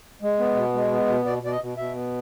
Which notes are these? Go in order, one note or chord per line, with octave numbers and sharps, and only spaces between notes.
G#3
B3
B2
G#3
B3
B2
B2 D5
B2 D5
D#5
B2
B2 E5
B3